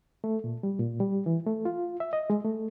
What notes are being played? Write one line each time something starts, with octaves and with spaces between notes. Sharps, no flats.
A3
A#2
G3
A#2
G3
E3
A3
F4
E5
D#5
G#3
A3